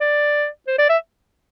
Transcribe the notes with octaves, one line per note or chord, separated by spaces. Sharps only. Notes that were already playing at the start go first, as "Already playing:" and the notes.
D5
C5
D5
E5